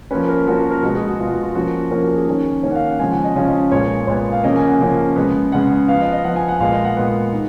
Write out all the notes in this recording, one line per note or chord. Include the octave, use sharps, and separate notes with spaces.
F3 A#3 C#4 B4
A#4
F3 A#3 C#4 F#4
A#4
A#4
B2 G#3 B3 F#4
G#4
F#4
B2 G#3 B3 F4
F#4
F4
F3 A#3 C#4 F#4
F3 A#3 C#4 A#4
F#4
G#4
D#3 A#3 C#4 G#4
D#3 A#3 C#4 C#5
F#5
F5
F#5
C#3 F3 G#3 C#4 G#5
F#5
D#5
C#3 F3 G#3 C#4 F5
D#5
A#2 G#3 B3 C#5
A#2 G#3 B3 C#5
F5
C#3 F3 A#3 C#4 D#5
G#5
F#5
C#3 F3 A#3 C#4
C#3 G#3 B3
C#3 G#3 B3 F#5
F3 B3 F5
D#5
D#5
F3 B3 F#5
G#5
F#5
A#2 G#3 B3 F5
D#5
F#5
A#2 G#3 B3
D#3